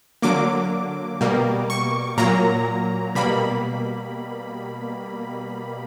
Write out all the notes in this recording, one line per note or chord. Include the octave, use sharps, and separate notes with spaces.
D3 F#3 A#3 D6
B2 G3 A#3
C#6
A#2 F#3 A#3 A#5
B2 G3 A#3 B5